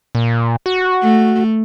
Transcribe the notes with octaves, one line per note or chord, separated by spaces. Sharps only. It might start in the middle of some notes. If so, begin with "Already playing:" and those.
A#2
F#4
A3